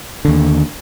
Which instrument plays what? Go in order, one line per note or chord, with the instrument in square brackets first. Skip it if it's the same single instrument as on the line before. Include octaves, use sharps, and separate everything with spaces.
[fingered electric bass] D#2 D3